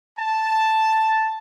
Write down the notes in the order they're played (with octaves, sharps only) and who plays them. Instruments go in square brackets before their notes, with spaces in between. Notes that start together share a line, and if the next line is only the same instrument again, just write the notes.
[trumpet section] A5